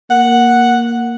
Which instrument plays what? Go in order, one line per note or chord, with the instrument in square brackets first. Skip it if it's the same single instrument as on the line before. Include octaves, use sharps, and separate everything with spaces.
[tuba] A#3 [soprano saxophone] F#5